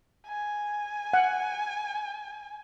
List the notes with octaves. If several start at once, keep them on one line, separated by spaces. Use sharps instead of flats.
G#5
F#5